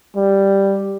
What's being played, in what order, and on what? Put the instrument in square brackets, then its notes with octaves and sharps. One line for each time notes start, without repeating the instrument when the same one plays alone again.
[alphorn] G3